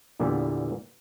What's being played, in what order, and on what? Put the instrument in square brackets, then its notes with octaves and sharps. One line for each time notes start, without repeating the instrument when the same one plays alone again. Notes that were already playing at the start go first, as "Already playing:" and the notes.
[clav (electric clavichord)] E2 A#2 D3 E3 G3 B3